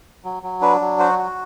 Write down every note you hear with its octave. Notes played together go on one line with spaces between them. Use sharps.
F#3
F#3
D4 B4
F#3
F#4 C5
F#4